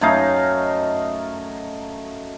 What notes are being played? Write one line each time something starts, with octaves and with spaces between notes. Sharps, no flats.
F#2 A3 D#4 F5